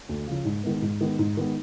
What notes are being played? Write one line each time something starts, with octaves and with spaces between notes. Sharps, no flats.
D2
C#3 F3
G#2
D#3 G#3 B3
G#2
D#3 G#3 B3
G#2
D#3 G#3 B3